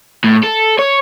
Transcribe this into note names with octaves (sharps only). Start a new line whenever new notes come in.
A2
A4
C#5